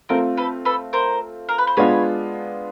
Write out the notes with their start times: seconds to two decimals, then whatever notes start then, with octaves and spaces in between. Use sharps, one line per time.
0.09 A3 C4 F4 A#4 C5
0.37 A4 B4
0.65 A4 B4
0.93 A#4 C5
1.49 A#4
1.58 B4
1.67 C5
1.77 G#3 B3 D4 F4 B4 C#5